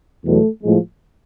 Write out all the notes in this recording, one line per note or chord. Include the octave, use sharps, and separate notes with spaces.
E2 B2 F#3 A3
A2 F3 G#3